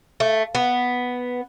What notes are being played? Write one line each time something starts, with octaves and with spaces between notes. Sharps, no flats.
A3
B3